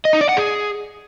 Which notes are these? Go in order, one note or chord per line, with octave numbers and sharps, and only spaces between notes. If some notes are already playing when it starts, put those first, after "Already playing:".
D#5
D#4
D5
F#5
G#4